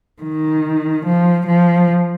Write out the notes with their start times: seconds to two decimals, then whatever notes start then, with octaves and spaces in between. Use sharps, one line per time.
0.22 D#3
1.06 F3
1.47 F3